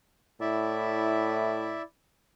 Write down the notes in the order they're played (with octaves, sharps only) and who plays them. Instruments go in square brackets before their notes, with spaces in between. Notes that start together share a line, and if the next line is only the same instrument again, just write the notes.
[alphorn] A2 [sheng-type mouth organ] E4 D5 E5